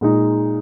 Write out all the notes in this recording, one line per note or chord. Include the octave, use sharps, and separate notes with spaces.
A#2 G#3 D#4